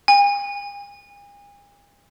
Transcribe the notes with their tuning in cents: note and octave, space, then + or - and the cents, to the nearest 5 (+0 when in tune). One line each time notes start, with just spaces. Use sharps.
G#5 -45